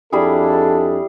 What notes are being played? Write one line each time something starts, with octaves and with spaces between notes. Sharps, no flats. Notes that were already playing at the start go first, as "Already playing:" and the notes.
F2 G3 D4 E4 G#4 A4